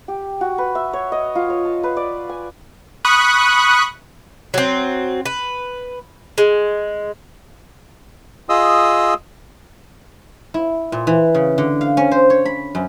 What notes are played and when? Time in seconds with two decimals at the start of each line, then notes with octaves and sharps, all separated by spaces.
0.08 G4
0.41 F#4
0.58 B4
0.75 E5
0.93 C#5
1.12 D#5
1.35 F4
1.50 C#5
1.65 A5
1.83 B4
1.97 D5
2.29 G#5
3.05 B5 C#6 D#6 F#6
4.54 F#3 C4
5.26 B4
6.38 G#3
8.49 F4 G#4 D#5 D#6 E6
10.54 E4
10.92 A#2
11.07 E3
11.34 C#3
11.58 D3
11.81 F5
11.97 C#4
12.11 C5
12.30 C#5
12.45 B5
12.75 F#2